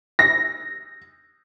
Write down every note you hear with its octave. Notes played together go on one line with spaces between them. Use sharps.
A#6